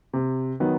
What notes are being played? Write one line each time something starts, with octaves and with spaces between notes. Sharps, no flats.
C3
D#3 F#3 B3 D#4